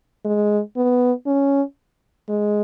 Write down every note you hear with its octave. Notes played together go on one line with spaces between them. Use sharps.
G#3
B3
C#4
G#3